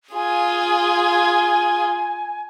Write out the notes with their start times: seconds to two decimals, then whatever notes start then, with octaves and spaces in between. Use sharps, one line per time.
0.15 F4 G#4 G#5